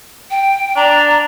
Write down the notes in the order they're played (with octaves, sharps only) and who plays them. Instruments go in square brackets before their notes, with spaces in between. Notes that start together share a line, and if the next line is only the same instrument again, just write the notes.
[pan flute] G5
[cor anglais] D4 [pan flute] A#5